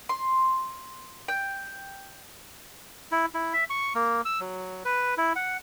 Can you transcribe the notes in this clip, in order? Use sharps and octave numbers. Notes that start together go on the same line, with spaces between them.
C6
G5
E4
E4
E5
C#6
A#3
E6
F#3
B4
E4
F#5